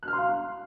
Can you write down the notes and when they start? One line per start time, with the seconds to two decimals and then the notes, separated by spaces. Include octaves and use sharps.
0.03 F#6
0.08 F6
0.13 C6
0.18 F5